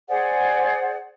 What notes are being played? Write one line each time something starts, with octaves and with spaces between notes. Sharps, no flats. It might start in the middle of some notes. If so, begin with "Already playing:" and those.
G#4 C5 D5 F#5